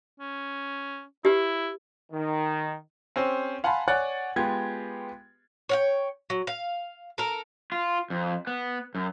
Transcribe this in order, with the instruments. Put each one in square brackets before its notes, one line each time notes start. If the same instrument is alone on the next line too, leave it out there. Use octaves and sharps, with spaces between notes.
[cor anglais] C#4
[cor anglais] E4 [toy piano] G4 B4
[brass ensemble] D#3
[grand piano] C4 C#4 G4 C5
F5 F#5 G#5 A5 B5 C6
C#5 D5 F#5 G#5 F#6 A6
G#3 B3 F4 G4 G#6
[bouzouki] C#5 F5 G5
F#3
F5
A4 A#4
[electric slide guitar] F4
F2
B3
F#2